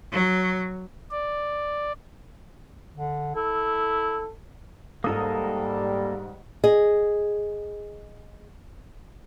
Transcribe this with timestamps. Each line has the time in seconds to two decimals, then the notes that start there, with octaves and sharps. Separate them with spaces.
0.12 F#3
1.11 D5
2.95 D3
3.36 E4 A4
5.04 G#2 G3 A#3 A4 A#4 D#6
6.64 G#4 D#5